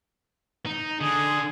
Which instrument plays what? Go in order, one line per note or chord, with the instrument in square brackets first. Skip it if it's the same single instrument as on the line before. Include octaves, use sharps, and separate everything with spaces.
[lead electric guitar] D#4
[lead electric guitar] D3 [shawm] G#4